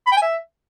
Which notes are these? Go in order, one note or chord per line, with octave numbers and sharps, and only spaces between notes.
B5
G5
G#5
E5